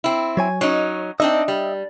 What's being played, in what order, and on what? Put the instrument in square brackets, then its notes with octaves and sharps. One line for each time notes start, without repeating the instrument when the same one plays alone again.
[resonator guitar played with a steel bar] C4 E4
[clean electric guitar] F#3 C#5 G#5
[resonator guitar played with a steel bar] F#3 C#4 D#4 [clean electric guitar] C#5
[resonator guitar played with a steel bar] C4 D4 D#4 [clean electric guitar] D#5 E5
[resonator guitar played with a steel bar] G3